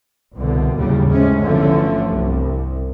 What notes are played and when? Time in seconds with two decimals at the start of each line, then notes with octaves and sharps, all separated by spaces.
0.34 C2 B2 D3
0.75 D#2 A2 C#3 F#3 G3
1.07 A2 C3 G#3 C#4
1.42 G1 D3 E3 F3 A3 C#4
2.09 C2